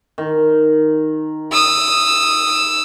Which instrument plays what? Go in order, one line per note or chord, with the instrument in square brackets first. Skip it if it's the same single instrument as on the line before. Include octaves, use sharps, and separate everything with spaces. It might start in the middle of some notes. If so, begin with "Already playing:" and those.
[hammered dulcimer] D#3
[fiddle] D#6 E6